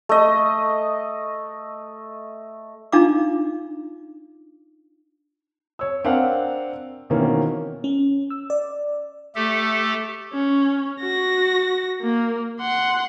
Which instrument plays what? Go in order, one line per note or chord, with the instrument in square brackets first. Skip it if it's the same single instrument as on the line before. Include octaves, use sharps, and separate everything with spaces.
[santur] A3 D#5
[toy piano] D4 D#4 F4 F5 A#5 D6
[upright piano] C#5 E6
C4 D4 A#4 F5 F#5
B2 D#3 E3 A#3 C4 C#4
[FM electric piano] C#4
E6
D5
[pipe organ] A3 G4 A4
[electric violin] C#4
F#4 A#6
A#3
F#5 C6